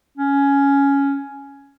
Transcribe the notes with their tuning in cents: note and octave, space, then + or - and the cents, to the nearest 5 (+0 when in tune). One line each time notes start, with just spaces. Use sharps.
C#4 +10